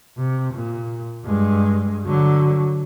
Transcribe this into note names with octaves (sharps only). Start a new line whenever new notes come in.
C3
A#2
G2 G#3
D3 F#3